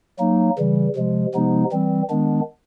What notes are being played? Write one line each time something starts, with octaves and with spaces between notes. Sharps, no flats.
F#3 A#3 D#4
C#3 E3 G3
C3 F3 G#3
C3 F3 G#3 B3 D#4
E3 G3 C4
D#3 G#3 B3 D4